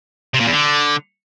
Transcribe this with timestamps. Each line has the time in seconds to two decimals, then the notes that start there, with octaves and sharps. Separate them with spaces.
0.34 C3
0.40 A#2
0.47 E2
0.53 D3